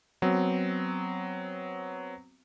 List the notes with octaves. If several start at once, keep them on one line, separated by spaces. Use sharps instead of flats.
F#3 B3 C4